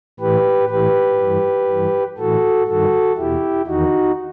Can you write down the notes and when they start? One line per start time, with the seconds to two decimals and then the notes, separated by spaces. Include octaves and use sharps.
0.20 A2 E3 G4 B4
0.69 A2 E3 G4 B4
1.20 G2 E3
1.69 G2 E3
2.18 A2 E3 F#4 A4
2.68 G2 D#3 F#4 A4
3.17 E2 B2 E4 G4
3.67 E2 D#3 D#4 F#4